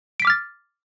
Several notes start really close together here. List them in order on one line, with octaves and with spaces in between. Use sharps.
D7 B6 D6 F6 A6